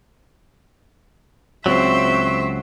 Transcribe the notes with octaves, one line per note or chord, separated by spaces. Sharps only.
C#2 F#3 C4 E5 C#6